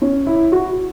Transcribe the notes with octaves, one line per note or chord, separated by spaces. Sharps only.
C#4
E4
F#4